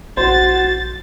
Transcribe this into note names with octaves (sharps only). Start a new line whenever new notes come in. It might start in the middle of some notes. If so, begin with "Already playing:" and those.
A#1 F#4 C5 A6